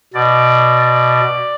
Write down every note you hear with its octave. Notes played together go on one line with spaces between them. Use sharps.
B2 D5
D5
D5